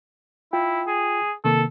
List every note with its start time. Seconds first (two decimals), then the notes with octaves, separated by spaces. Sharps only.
0.53 E4 F4 G5
0.87 G#4
1.45 C3 D#3 A#3 A4